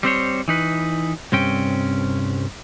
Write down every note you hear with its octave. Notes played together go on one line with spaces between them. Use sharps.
G3 C4 C5 C#5
E3 D#4 B4
C2 G2 C4 C#4 G5